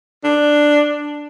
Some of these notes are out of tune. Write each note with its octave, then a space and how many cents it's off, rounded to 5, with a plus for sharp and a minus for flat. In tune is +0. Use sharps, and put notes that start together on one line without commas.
D4 +5